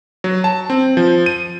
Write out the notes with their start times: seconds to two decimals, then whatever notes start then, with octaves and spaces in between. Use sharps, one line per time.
0.24 F#3
0.44 A5
0.70 C4
0.97 F3
1.26 D#7